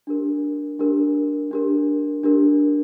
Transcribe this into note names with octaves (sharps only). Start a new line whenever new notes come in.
D4 G4 A#4
D4 G4 A#4
D4 G4 A#4
D4 G4 A#4